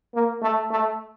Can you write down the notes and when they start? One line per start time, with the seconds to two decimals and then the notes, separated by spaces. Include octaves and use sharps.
0.15 A#3
0.42 A3
0.71 A3